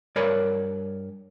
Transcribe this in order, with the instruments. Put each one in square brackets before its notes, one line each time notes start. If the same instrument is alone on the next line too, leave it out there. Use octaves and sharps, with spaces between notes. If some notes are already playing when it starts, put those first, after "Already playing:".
[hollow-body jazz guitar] G2 A#4 C#5 D5 B5